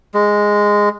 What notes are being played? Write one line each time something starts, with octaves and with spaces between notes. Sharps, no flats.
G#3